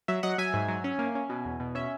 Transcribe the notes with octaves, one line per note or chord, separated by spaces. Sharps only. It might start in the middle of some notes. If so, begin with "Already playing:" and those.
F#3 E5
F#3 D#5 F#5
F#3 E5 G#5
G#2
F#3
C#4
A#3
C#4
B2
E2
B2
C#4 E5